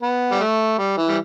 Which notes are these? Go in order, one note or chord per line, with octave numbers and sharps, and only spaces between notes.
B3
G3
A3
G3
E3
G3